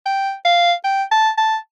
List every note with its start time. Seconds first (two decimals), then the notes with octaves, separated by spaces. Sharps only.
0.06 G5
0.45 F5
0.84 G5
1.11 A5
1.38 A5